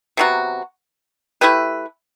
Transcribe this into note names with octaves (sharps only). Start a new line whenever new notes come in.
C3 F#3 B3 F#4
A3 E4 G4 B4